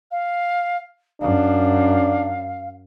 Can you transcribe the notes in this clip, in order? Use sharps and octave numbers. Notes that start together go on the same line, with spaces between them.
F5
F#2 D4 F5